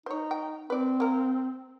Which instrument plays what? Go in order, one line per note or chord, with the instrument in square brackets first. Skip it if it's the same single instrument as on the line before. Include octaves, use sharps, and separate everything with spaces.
[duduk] D#4 [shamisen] C5 C#5
[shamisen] G5
[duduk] C4 [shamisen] B4 D5
[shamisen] A#3 A#4